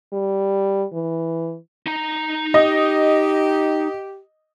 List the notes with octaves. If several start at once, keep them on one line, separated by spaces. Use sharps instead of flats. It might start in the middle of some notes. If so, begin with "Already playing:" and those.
G3
E3
D#4 A#5
G4 D#5